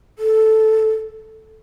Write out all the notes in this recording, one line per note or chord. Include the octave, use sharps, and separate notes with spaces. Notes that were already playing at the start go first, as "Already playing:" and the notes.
A4